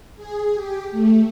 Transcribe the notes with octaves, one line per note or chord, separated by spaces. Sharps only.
G#4
G4
A3